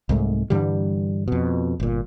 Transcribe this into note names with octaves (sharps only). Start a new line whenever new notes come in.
C2 G#2 A3
G2 D3 E3 G3
F2 B2
G1 A#2